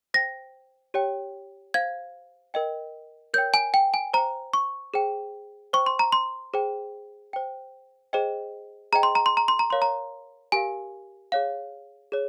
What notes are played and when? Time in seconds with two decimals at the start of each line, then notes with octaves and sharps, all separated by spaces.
0.14 C5 G5 A#6
0.94 G4 C#5 G5
1.74 C5 F5 G#6
2.54 A#4 D#5 G5
3.34 A#4 C#5 G5 G6
3.54 G#5
3.74 G5
3.94 G#5
4.14 C5 G5 A#5
4.53 C#6
4.94 G#4 C5 G5
5.73 C5 G5 C#6
5.86 C6
5.99 A#5
6.12 C6
6.54 G#4 C5 G5
7.33 C5 G5
8.13 G#4 C5 D#5 G5
8.92 G#4 C5 D#5 G5 A#5
9.03 C6
9.15 A#5
9.26 C6
9.37 A#5
9.48 C6
9.59 A#5
9.70 A#4 C#5 F5 C6
9.82 A#5
10.52 G4 A#4 F5 G#5
11.32 G#4 C#5 F5
12.12 G#4 C#5